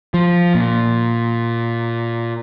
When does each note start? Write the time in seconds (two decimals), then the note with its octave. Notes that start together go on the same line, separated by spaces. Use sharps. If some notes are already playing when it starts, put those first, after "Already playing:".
0.14 F3
0.55 A#2